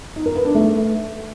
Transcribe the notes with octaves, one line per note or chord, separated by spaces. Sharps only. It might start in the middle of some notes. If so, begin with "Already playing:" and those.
D#4
A#4
B4
D4
A3